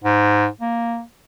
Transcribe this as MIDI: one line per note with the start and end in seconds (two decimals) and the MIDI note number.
0.04 0.48 44
0.61 1.02 58